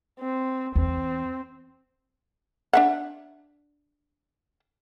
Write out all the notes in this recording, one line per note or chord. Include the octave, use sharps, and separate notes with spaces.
C4
E2 C4
D4 E5 F#5